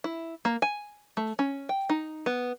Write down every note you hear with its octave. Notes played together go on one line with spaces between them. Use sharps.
E4
A#3
G#5
A3
C#4
G5
D#4
B3